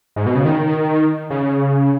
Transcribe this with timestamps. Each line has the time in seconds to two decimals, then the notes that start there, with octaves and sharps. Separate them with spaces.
0.16 G#2
0.26 B2
0.35 C#3
0.45 D#3
1.30 C#3